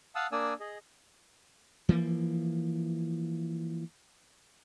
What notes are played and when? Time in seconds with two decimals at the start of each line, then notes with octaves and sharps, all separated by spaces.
0.15 F5 F#5 A5 D#6 E6
0.32 A#3 D4 D5 G#5 D#6 E6
0.60 G#4 D#5
1.89 E3 F3 A3 A#3